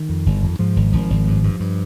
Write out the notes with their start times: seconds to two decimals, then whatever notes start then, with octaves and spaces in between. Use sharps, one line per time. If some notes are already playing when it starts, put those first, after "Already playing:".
Already playing: D#3
0.09 F2
0.26 G1
0.42 F2
0.59 G#2 F3
0.76 G#1
0.93 G#1 F3
1.10 G#1
1.27 G2
1.44 G2
1.60 G2